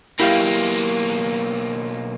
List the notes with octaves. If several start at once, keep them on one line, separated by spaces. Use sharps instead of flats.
B1 A#3 E4 G4 F5